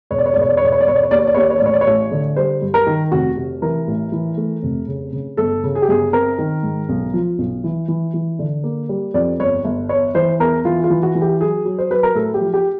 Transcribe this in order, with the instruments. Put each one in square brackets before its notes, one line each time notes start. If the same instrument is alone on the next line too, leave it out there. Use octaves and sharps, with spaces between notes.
[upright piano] E1 C#5
D5
C#5
E1 D5
C#5
D5
C#5
E1 D5
C#5
D5
E1 C#5
D5
C#5
D#2 D5
C#5
D5
D#2 C#5
D5
C#5
D5
A1 C#5
D5
C#5
A1
D3
G3 C5
G2
A#4
D#3
F1 F#4
C3
E3 A#4
A1
E3
A3
F1
C#3
C#3
G1 A4
C#3
G#4
G4
G1 G#4
C4 A#4
D#3
G#2
B1
F3
B1
E3
E3
E3
D3
A#3
G3
F2 D5
G1 C#5
G1
E2 C#5
E3 C5
E2 A#4
E3 F4
F4
E3
F#4
E3
G4
F#3 G#4
F#3
C5
F#3 B4
A#4
A2 A4
G4
F3
G4